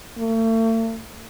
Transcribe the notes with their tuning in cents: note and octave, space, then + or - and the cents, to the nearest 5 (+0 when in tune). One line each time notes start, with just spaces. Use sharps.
A3 +40